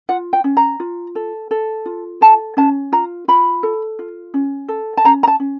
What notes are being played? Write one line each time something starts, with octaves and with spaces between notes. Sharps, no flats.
F4 F#5
G5
C#4
A#5
F4
A4
A4
F4
A4 A5
C#4 A5
F4 A#5
F4 B5
A4
F4
C#4
A4
A5
C#4 A#5
A#5
A5
C#4